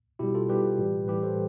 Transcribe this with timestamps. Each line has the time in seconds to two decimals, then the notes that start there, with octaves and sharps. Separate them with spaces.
0.19 B2 G3 E4 G4
0.35 F4 A4
0.49 B2 G3 G4 B4
0.78 A2 E3 G3
1.08 A2 E3 G3 G4 B4
1.23 A4 C5